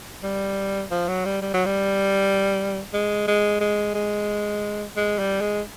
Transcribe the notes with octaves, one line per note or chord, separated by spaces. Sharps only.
G3
F3
F#3
G3
G3
F#3
G3
G#3
G#3
G#3
G#3
G#3
G3
G#3